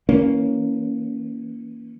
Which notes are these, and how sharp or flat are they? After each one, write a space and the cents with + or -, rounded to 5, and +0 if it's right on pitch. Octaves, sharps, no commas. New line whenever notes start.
E3 -25 A#3 +0 C#4 +0